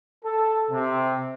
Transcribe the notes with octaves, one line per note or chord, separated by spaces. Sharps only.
A4
C3